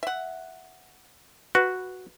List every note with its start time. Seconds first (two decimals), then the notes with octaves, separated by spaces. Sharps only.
0.03 E5 F#5
1.55 F#4 B4